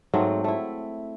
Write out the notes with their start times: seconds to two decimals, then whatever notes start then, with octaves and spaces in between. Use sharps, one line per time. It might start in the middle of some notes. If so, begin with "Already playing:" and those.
0.14 G#2 F#3 A3 C4
0.44 A3 E4